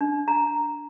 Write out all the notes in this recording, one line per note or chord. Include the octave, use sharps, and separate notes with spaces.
D4
A#5